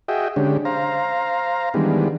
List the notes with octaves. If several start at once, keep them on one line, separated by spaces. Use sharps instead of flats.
F#4 G#4 D#5 E5 G5
D3 G#3 C#4 D4 G4
C5 F5 A#5
D#3 E3 G3 G#3 B3 D4